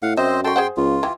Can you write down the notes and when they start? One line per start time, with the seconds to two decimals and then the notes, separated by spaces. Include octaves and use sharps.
0.02 A2 F5 F#5
0.17 F#2 C4 C5 D#5 E5
0.44 F#4 A4 G5 C6
0.56 G#4 C5 F#5
0.77 C#2 F4
1.03 E3 G4